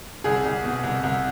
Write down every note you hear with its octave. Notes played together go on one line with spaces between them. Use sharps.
C2 G#4
C2
B2
C2
C2